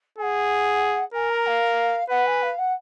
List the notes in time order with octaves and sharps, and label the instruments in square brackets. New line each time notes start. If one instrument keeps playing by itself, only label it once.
[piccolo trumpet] G#4 [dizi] F#5 G#5
[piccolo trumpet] A#4 [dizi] G#5
[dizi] A#5
F5
[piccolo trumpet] B4 [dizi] F#5
[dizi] G#5
F5
F#5